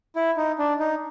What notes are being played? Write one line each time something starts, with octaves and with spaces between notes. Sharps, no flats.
E4
D#4
D4
D#4